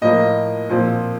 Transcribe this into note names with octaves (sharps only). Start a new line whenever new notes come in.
A2 F3 A#3 D#5
A#2 F3 C4